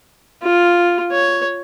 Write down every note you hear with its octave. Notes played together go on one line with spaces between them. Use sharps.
F4
C#5